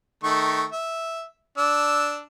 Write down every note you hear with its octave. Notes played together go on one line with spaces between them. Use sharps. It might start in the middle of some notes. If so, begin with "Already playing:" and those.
D#3 A3 C#6
E5
D4 E6